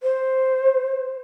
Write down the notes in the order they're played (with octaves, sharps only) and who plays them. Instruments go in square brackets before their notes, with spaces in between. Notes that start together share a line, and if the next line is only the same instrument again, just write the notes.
[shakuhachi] C5